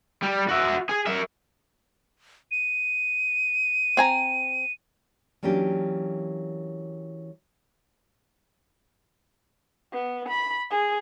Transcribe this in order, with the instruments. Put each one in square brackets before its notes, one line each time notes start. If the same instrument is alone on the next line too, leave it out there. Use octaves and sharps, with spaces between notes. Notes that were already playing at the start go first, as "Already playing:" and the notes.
[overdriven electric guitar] G3
F#4 E5
G#4
A#4 E5
[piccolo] D#7
[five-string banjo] C4 G#5 A#5
[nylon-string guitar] E3 F#3 A#3 C#4 D4 G4
[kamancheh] B3
B5
G#4